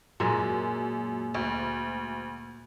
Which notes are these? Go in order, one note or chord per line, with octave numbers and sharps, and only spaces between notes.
F#2 A#2 G#3
D2